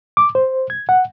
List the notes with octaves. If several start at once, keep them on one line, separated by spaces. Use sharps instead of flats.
D6
C5
G#6
F#5